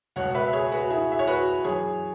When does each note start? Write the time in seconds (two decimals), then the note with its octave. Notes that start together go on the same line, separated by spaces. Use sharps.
0.16 C#2 B2 C#5 F#5
0.34 B4 E5
0.47 E5
0.53 G#4 C#5
0.72 F#4 B4
0.90 E4 G#4
1.12 E5
1.19 C#5
1.27 F#4 B4
1.65 F#2 E3 G#4 C#5